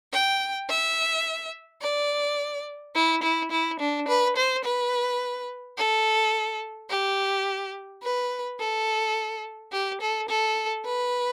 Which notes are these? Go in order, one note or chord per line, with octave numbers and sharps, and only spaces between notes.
G5
E5
D5
E4
E4
E4
D4
B4
C5
B4
A4
G4
B4
A4
G4
A4
A4
B4